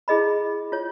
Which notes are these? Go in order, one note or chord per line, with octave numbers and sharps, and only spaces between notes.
E4 G#4 D#5 B5
F4 C#5